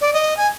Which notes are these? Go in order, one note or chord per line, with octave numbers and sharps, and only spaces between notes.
D5
D#5
G#5